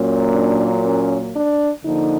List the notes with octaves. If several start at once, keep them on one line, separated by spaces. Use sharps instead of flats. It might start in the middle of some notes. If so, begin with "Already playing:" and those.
Already playing: A#2 F#3 A#3 C#4
D4
C#4
D4
D3 F3 A#3 D#4